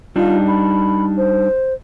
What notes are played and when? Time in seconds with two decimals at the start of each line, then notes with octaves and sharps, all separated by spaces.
0.16 G3 D4 D#4 F4
0.47 B5
1.17 C5